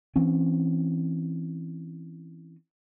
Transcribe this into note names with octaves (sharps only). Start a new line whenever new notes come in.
E3 C4 C#4